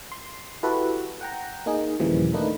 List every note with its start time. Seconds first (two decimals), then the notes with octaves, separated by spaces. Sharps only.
0.12 C6
0.63 E4 F#4 G4 A4 B4
1.21 F#5 G5 A#5
1.66 A#3 D#4 G#4
2.00 D#2 A#2 C#3 E3 F3 G3
2.33 A3 A#3 D4 D#4 B4